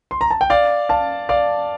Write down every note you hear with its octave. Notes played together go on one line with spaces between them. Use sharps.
C6
A#5
A5
G5
D5 F5
F5 A5
D5 F5